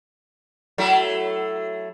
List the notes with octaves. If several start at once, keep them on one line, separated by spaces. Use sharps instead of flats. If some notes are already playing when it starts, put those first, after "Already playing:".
F#3 A3 E4